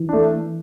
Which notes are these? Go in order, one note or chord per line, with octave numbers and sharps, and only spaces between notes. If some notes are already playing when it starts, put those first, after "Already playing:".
Already playing: E3
A3 D4